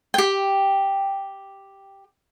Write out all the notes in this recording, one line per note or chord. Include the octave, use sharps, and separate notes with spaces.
G4 G5